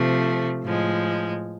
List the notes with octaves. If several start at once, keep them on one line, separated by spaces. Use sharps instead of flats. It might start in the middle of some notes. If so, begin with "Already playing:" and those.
Already playing: C3 F3 A3
A2 F3 G#3